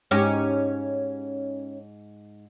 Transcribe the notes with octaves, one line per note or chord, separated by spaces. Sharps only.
G#2 C#4 D#4 G4